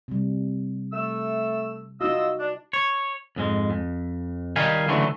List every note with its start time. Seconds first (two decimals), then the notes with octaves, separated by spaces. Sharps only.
0.08 C3 G3
0.93 A3 E6
2.01 D#4 F4 F#4 D#5 E6
2.39 D4
2.73 C#5
3.36 F2 G#2 G#3
3.70 F2
4.56 D#3 G3 D#4 G4 F5 G#5
4.88 C#2 D3 E3 F#3 A3